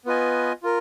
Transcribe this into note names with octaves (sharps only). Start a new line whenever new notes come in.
B3 F4 B4 D#5 G#5
F4 A#4